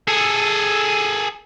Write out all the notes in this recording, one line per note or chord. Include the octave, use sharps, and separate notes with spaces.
G#4 A4